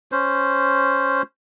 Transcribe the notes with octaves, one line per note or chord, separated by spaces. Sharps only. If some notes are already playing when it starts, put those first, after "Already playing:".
C#4 C5